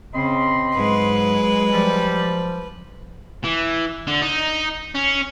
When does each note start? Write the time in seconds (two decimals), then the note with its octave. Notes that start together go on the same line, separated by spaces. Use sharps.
0.14 C#3 C4 D#5 B5 C6
0.76 G#2 F#3 G#3 B4
1.73 F3 G3
3.44 E3
4.07 D3
4.22 D#4
4.95 C#4